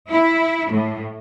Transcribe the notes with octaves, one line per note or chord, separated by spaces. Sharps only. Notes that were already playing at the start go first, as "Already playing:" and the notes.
E4
A2